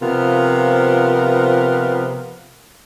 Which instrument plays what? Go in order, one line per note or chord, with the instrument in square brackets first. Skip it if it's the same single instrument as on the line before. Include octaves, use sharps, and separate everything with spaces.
[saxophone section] C3 F3 B3 F4 A#4